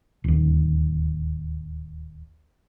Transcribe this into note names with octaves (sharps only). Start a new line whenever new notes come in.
D1 D#2